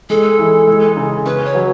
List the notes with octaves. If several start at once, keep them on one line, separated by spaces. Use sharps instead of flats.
G#3 A4
E3
G#3
C#3
C#4 B4
C#5
F#3